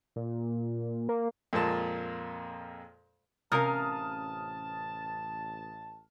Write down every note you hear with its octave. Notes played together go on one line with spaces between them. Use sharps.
A#2
A#3
F2 A#2 G#3 A#3 A5
A1 C3 C#4 A#4 F5 A5 D#6 F6